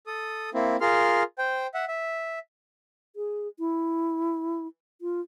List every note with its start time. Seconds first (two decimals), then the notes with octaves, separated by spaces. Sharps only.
0.07 A4 D#6
0.54 A#3 C4 E4
0.81 F4 G#4 A#4 C6 F6
1.39 C5 G5
1.74 E5 F#5
1.88 E5
3.16 G#4
3.59 E4
5.01 F4